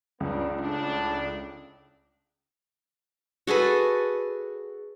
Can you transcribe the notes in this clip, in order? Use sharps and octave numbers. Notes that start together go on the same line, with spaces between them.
C#2 C#3 B3 D4
A2 D4
F#4 G#4 A4 B4